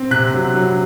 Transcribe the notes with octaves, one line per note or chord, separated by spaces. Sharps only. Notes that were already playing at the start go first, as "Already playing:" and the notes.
Already playing: C4
C3 F#6
F#3
F#3